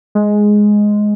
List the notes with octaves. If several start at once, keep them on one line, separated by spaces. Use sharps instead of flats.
G#3